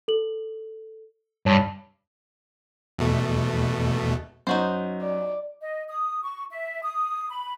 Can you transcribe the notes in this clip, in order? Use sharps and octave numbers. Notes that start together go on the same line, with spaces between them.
A4 F#7
G2 C#5 A5
E2 B2 A3
F#2 D#4 F#4 C5
D5
D#5
D#6
C#6
E5
D#6
B5